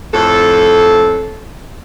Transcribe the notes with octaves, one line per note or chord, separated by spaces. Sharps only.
F2 A2 A4